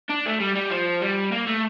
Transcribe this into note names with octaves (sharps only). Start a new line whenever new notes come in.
D4
A3
G3
G3
F3
G3
A#3
A3